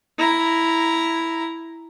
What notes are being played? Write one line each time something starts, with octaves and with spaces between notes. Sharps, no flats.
E4 A#5